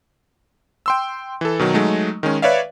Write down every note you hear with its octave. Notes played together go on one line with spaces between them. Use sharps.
G5 C6 E6
E3 A4
B2 D#3 F#3
F#3 G#3 A3 D#4
D#3 G#3 C#4
B4 C#5 D5 E5 F5